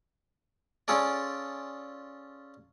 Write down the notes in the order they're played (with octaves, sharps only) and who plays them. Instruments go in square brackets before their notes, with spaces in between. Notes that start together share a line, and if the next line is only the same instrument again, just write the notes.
[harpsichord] C#4 F4 G#4 A4 D5